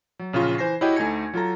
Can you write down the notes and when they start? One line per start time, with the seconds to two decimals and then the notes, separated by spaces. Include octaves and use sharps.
0.19 F#3
0.33 A#1 C#3 C#4 F4 C#6
0.58 E3 C5 G#5 A#6 C7
0.81 E4 F#4 G4 C#5 D#5 G5
0.96 D2 A3 D#4 G#5 G#6 C#7
1.34 F#3 F4 A4 A#5